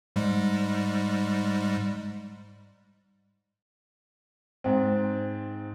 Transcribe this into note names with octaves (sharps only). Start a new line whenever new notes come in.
G#2 G3 G#3
G#2 C4